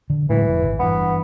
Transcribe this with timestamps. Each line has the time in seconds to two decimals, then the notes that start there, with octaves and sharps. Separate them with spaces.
0.10 D3
0.29 A2 E3 F#3 G#3
0.47 F1
0.62 G#1
0.79 G2 E3 B3